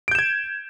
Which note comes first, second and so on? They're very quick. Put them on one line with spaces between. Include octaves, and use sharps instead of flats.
D7 G6 E7 G#6